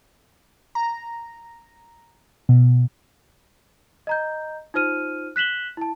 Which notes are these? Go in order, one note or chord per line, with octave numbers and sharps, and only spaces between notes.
A#5
B2
D#5 A#5 G6
D#4 F4 C5 F6 D#7
F#6 B6 E7 F#7 G7
E4 A5